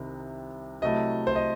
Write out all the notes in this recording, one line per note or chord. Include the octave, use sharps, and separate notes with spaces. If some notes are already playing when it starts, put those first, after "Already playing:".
Already playing: C2 C3 D#3
C3 F#3 A3 E4 D#5
C5
D#5